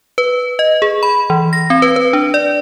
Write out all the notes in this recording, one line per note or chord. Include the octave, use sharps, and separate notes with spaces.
B4
D#5
G#4
B5
E3
A#6
C4
B4
B4
D4
D5